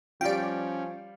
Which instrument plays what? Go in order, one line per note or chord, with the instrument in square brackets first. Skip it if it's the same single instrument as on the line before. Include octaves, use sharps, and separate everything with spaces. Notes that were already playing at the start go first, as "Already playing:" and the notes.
[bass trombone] F3 [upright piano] G3 F4 [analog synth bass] C#4 [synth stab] D5 G5